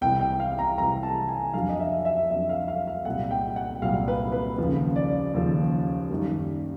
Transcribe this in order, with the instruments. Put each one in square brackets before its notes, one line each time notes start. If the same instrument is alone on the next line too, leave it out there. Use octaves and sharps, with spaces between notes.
[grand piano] C2 C3 E3 G5
G5
F5
A#5
C2 C3 E3 A#5
A5
G#5
F2 D3 F#3 F5
D#5
E5
E5
F2 D3 F#3 E5
F5
F5
F5
C2 A#2 F#3 F#5
G5
F#5
C2 A#2 F#3 F5
B4
B4
D#2 C#3 F3
D5
D#2 C#3 F3
F#2 D#3 G3 A#3